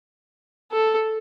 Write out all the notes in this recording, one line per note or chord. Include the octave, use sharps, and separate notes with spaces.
A4